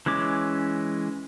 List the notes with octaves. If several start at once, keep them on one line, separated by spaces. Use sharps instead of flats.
E3 G#3 C#4 D6